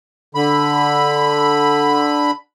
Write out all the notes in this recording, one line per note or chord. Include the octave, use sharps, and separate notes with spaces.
D3 B5